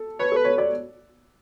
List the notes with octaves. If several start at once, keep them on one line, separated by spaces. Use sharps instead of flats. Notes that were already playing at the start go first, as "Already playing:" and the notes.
Already playing: A4
B4 C#5
A4
B4
C#5
D5